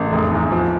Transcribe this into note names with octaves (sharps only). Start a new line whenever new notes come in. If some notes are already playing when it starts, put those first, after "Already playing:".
Already playing: A1 A#4
F1
E2
F3